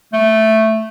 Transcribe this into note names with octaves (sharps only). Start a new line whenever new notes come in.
A3